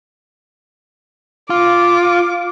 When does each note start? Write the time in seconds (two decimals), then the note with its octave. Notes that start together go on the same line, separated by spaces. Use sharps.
1.50 F4 D6